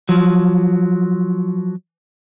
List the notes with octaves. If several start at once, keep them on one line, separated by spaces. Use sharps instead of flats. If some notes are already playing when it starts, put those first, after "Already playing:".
F3 F#3